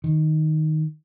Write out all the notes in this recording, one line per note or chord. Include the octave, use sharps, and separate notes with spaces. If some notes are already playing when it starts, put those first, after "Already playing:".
D#3